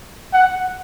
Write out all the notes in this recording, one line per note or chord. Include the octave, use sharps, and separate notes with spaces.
F#5